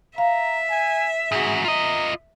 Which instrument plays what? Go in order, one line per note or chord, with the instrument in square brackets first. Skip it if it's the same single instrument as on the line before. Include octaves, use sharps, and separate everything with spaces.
[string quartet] E5 [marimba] F5 [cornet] A#5
[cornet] G#5
[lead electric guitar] G#2 F#4 [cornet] G#4
[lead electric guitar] F4 D#5 [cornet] A#5